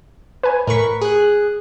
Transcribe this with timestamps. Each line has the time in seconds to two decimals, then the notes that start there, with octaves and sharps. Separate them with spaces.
0.43 B4 G#5
0.67 A2 A#4 B4 C#6 B6
1.01 G#4 F#6